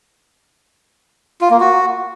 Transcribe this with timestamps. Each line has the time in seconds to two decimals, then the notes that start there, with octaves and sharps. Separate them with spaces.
1.41 F4
1.50 A#3
1.60 F#4